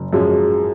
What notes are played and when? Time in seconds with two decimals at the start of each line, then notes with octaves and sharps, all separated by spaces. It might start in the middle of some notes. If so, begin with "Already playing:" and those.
Already playing: F#1
0.13 F#2 F3 G#3